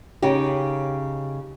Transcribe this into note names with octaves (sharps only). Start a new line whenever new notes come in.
C#3 D#4 G4